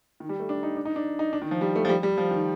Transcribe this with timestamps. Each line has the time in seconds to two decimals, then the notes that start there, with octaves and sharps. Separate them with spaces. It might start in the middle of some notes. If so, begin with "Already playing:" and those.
0.20 D#3
0.29 G3
0.40 A3
0.49 D4
0.63 D#4
0.77 D4
0.85 D#4
0.96 D4
1.19 D#4
1.33 D4
1.42 D#3
1.51 F3
1.61 G3
1.75 A3
1.85 F3
1.89 G3
2.03 G3
2.18 F3
2.31 D#3